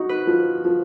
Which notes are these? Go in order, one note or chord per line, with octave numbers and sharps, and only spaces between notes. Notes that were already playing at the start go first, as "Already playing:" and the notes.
Already playing: D#4 F#4
B4
F3
F3